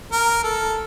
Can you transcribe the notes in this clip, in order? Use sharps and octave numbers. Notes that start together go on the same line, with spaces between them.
A#4
A4